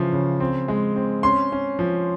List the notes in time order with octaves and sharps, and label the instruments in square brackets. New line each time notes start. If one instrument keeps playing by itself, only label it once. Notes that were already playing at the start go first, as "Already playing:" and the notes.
Already playing: [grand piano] C#3 E3 F3
C#3
C4
G#3
C4
C#4 C6
C#4
F3